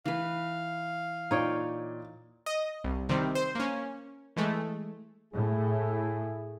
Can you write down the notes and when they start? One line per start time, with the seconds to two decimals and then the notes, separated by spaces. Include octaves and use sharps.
0.06 E3 B4 F5
1.31 A#2 D#4 C#5 D5 G5
2.46 D#5
2.84 C2
3.09 C3 D#3 G3 C4
3.35 C5
3.55 A#3 C#4
4.36 E3 G#3 A3
5.34 A2 E4 G#4